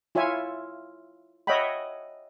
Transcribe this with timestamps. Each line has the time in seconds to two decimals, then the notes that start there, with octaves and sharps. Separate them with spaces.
0.15 E4 F4 C#5 E5 G#5
1.47 C#5 D#5 E5 F#5 G5 B5